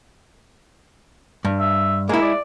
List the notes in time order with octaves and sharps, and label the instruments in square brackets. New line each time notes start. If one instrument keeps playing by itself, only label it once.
[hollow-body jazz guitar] G2
[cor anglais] E5
[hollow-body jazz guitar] G#3 E4 [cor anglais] A#3
[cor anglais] D5